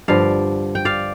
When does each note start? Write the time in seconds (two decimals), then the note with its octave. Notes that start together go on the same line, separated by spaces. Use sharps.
0.08 G2 D3 F3 D5 F5
0.75 G5
0.85 D5 F5